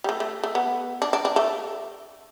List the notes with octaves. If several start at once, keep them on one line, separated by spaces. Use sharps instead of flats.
G3
A3
A3
A3
B3
D4
D4
D4
A3